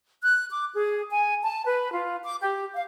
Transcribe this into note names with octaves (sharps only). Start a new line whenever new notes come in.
F#6
D6
G#4
G#5
A5
B4
F4
D6
G4
F5